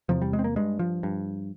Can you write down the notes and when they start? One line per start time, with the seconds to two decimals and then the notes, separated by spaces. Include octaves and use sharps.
0.09 E2 C3 F3
0.22 G3
0.33 G#3
0.39 C4
0.44 A#3
0.56 G2 G#3
0.79 F3
1.03 G2